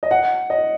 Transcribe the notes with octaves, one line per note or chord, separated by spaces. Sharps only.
D#5
F#5
D#5